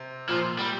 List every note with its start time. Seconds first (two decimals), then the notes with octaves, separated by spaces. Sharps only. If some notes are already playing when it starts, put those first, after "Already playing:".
Already playing: C3
0.29 A#2 F3
0.58 G3